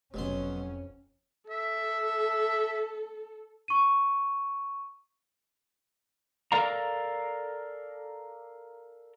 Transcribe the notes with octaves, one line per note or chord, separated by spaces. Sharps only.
F1 F2 B2 F#3 C#4 C6
A4 E5
C#6 D#7
A4 A#4 D5 F5 A#5